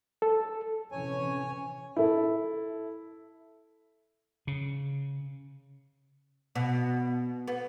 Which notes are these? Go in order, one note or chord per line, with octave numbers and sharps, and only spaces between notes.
A4
C3 E3 C#4 C#5 G#5
E4 A4
C#3
B2
B3